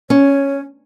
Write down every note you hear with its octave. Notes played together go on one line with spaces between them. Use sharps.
C#4 C#5